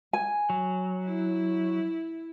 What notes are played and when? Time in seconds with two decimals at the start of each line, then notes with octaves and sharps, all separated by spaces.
0.13 G#5
0.50 F#3
1.05 E4